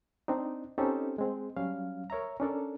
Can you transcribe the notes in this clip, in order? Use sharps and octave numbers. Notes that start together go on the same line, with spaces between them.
C4 D4 D#4
C4 C#4 D#4 G4 A4 C5
G#3 C4
F#3 G3 C#4 F5
A#4 C#5 E5 A#5
C#4 D4 A4 A#4